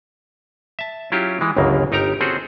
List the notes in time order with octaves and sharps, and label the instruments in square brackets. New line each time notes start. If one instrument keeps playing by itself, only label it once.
[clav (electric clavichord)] E5 A5
F#3 C#4 E4 F4 G4
E3 G#3
G1 C#2 F#2 C#3 A#3
G1 D#4 G4 A#4 A#5
C4 C#4 F#4 G#4 A4 C5